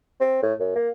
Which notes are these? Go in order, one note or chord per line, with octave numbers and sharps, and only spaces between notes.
C4
A2
F#2
A#3